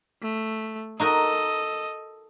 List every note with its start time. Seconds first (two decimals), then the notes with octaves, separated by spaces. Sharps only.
0.22 A3
1.00 D#4 F#4 A4 A#4 D#5